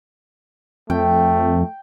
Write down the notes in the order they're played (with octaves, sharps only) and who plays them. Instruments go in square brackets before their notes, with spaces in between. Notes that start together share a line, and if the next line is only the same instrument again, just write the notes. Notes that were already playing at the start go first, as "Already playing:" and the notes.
[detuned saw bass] F2 [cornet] A3 [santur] G5